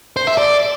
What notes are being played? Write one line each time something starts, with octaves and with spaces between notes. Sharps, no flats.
C5
E5
D5